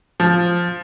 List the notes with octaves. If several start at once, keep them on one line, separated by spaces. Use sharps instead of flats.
F3